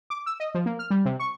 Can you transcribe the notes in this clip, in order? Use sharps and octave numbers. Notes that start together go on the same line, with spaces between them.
D6
E6
D#5
F3
A#3
F6
G3
C3
C#6